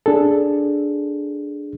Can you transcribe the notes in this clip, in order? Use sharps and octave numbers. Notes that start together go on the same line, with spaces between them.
D4 G#4 A4